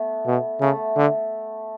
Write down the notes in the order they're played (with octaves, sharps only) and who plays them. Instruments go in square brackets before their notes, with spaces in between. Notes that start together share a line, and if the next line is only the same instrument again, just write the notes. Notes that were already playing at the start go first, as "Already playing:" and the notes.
Already playing: [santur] A3 B3
[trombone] B2
[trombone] C#3 [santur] A3
[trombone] D3